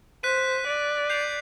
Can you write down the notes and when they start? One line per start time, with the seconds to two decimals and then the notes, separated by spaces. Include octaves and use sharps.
0.23 C5 F#6 B6 D#7
0.67 D5
1.10 G6 C7 F7